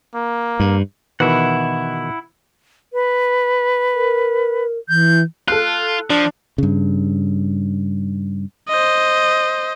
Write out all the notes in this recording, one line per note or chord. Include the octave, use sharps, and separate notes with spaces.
A#3
G2
B2 D#3 E3 E4 F#5
B4
A#4
E3 G6
F4 A4 F#6
F3 D4
G2 C#3
C5 D#5